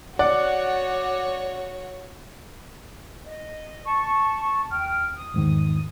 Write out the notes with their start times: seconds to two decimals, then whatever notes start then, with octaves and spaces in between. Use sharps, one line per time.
0.19 F#4 C#5 D5 F#5
3.26 D#5
3.85 A5 C#6
4.70 D#2 G5 F6
5.16 D#6
5.34 E2 G#2 D#3